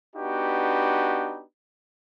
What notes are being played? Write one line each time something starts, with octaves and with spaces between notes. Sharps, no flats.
B3 D4 D#4 F#4 G4 B4